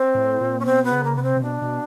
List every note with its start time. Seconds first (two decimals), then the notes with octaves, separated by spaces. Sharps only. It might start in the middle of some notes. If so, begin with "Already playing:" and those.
Already playing: C4
0.15 A2
0.41 A#2
0.60 C#4
0.65 B2 C4
0.84 B3
0.91 C#3
1.04 A#3
1.16 C3 B3
1.23 C4
1.37 C3
1.42 B2 D4
1.62 B2